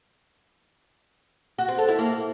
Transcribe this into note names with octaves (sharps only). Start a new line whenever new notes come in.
F#4
C4
A4
E4
A#3